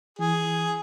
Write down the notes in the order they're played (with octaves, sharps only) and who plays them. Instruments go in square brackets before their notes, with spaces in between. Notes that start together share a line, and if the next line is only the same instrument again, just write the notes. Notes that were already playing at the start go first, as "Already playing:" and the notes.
[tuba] E3 [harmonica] G#4